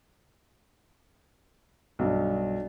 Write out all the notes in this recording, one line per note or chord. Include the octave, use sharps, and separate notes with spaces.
B1 G2